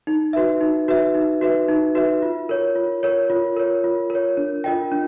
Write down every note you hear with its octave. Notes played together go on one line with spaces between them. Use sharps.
D#4
F#4 B4 E5
D#4
F#4 B4 E5
D#4
F#4 B4 E5
D#4
F#4 B4 E5
F4
A#4 C#5
F4
A#4 C#5
F4
A#4 C#5
F4
A#4
C#5
D4
F4 A#4 D#5 G5
D4